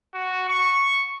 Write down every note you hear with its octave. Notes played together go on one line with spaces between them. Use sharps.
F#4
C#6